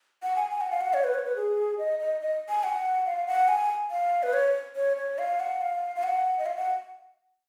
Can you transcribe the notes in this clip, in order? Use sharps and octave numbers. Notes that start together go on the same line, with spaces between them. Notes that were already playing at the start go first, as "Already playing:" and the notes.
F#5
G#5
G#5
F#5
F5
F#5
C#5
B4
C#5
B4
G#4
D#5
D#5
D#5
G#5
F#5
F5
F#5
G#5
F5
B4
C#5
C#5
C#5
F5
F#5
F5
F5
F#5
D#5
F5
F#5